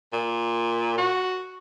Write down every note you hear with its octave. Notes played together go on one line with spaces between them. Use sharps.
A#2
F#4